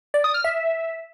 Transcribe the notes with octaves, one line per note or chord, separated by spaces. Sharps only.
D5
D#6
F6
E5